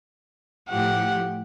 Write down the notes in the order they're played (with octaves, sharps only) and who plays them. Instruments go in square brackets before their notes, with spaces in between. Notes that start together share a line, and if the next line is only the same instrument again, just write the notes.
[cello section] A2 F3 G4 [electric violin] F#5